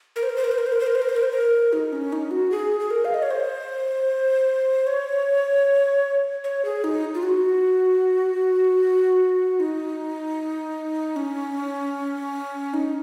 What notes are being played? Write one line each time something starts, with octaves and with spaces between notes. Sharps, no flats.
A#4
C5
A#4
C5
A#4
C5
A#4
C5
A#4
C5
A#4
C5
A#4
C5
A#4
C5
A#4
D#4
C#4
D#4
F#4
G#4
G#4
A#4
F5
D#5
C#5
C5
C#5
C#5
G#4
D#4
F4
F#4
D#4
C#4
D#4